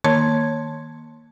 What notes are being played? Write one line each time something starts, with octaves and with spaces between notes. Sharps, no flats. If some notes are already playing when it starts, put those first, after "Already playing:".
D#3 A#3 C#5 A5 C6 G#6